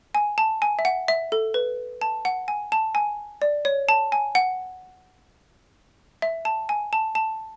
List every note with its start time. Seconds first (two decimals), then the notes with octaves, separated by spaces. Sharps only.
0.15 G#5
0.38 A5
0.62 G#5
0.79 E5
0.85 F#5
1.08 E5
1.32 A4
1.54 B4
2.02 A5
2.25 F#5
2.48 G#5
2.72 A5
2.95 G#5
3.42 D5
3.65 C#5
3.89 A5
4.12 G#5
4.35 F#5
6.22 E5
6.45 A5
6.69 G#5
6.93 A5
7.15 A5